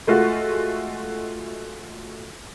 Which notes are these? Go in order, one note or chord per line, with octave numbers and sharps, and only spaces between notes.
G#3 A3 F4 F#4